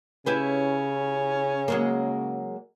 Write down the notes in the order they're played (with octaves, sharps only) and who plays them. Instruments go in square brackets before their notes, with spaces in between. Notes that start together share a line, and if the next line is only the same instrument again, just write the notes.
[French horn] C#3 [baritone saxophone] C#4 [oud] E4 G4 B4
[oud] F#3 G#3 A#3